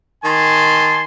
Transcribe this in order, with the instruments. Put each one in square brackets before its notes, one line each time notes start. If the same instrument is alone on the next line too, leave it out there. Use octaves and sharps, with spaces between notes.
[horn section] D#3 G#5 A5 C6